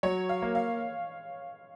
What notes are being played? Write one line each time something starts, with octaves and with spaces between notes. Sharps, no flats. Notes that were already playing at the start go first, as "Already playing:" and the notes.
F#3 C#5
F5
A#3
F5